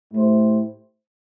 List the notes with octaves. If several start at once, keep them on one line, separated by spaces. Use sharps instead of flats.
A2 A3 E4 G4 C5